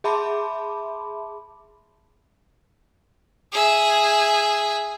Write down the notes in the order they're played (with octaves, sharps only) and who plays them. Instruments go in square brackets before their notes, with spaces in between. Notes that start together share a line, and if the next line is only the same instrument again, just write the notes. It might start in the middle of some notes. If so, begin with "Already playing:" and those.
[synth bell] G#4 E5 A5 B5 C6 D6
[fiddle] G#4 E5